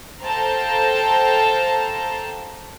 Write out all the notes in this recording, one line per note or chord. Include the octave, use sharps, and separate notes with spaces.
A4 C5 F5 G5 A5 A#5